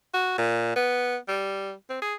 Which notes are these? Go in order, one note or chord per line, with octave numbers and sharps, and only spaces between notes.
F#4
A#2
B3
G3
C4
G#4